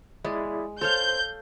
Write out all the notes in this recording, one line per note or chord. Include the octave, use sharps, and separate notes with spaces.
G#3 E4 G#4 D5
A4 C5 C#5 F5 G6